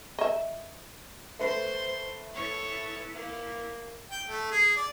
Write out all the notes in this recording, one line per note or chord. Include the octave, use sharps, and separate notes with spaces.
D#5 E5
A3 B4 C5 C6
B3 E4 A4 C#5
A#3
G5
A3
G#4
D5